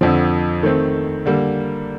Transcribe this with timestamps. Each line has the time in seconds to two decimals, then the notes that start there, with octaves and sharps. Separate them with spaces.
0.01 F2 D3 F3 C4
0.63 D#3 A3 C4
1.26 D3 G3 A#3